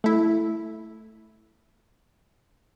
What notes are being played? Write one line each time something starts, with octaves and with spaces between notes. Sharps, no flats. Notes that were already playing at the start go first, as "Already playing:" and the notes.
A3 E4